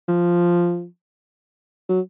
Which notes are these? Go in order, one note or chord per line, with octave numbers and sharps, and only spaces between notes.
F3
F#3